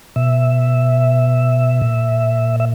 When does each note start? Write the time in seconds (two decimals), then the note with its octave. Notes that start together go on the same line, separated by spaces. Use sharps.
0.16 B2 E5
1.81 A#2
2.60 E5